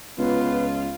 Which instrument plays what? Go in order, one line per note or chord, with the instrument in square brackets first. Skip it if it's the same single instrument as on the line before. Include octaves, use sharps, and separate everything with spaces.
[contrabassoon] C#2 [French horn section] B3 [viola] F4 [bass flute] B4